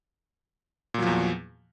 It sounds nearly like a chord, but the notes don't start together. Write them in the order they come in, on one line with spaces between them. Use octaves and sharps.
A#2 F#3 F3 E2